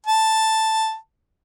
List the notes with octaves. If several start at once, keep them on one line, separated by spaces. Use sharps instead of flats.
A5